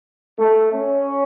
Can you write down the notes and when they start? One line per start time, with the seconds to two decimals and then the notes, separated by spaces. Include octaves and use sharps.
0.39 A3
0.72 C#4